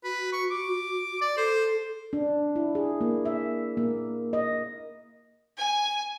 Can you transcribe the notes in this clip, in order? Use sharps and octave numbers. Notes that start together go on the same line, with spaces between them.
F#4 B4
C#6
D6
D5
A4 C5
D4
E4
G#4
A#3
E5
A#3
D#5
G#5